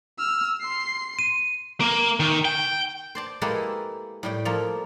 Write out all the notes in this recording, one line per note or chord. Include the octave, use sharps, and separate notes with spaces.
E6 F6
C6 C7
D#7
A#3
D#3
G5
C5 D5 A5
G#3 A#3 E4 G4 A4 B4
A2 G3 G5
F3 A#3 F4 A4